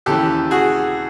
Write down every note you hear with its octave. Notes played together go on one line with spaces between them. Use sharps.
D#2 C#3 E3 G4 A4
F#4 G#4